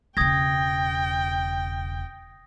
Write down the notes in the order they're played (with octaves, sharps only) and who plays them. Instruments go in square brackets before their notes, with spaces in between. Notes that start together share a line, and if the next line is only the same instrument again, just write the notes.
[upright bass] E1 C#3 [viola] G5 [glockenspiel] D#6 G#6 A#6